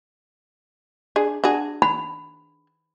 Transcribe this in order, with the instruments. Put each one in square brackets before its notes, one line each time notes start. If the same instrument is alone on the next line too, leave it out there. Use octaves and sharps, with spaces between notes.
[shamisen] D4 G#4
D4 F#4 G#4
[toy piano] B5